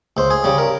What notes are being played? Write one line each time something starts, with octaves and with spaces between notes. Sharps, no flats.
C#2 C5
G#4
C#3 G3
A#4